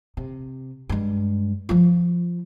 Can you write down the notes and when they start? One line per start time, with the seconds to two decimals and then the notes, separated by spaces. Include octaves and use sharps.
0.17 C3
0.89 G2 G#3
1.69 F3 F4